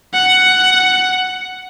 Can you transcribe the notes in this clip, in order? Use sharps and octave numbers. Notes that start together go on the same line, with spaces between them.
F#5